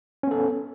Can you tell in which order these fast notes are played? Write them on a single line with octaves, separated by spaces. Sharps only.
C#4 B3 A4